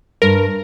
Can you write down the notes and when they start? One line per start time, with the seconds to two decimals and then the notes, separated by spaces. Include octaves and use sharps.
0.22 G2 A#4